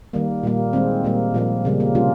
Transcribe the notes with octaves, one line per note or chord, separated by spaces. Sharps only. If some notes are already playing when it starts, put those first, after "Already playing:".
D#3 G3 A#3
A#2 G3 A#3
D#3 G#3 C4
A#2 G3 A#3
A#2 F3 A#3
C#3 G3 A#3
A#3
C3 G3 A#3 C#4 F4